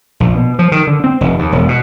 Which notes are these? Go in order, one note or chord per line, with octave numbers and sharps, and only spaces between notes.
A#1
B2
F3
D#3
D3
C4
F1
D#2
E1
B2